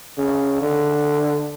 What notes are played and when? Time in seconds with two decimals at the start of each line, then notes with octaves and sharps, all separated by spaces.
0.18 C#3
0.61 D3